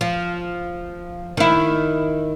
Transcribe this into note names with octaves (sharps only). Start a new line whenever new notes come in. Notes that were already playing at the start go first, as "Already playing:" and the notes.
F3
D#3 E4